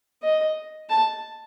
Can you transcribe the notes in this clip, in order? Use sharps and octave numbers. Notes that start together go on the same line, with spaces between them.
D#5
A5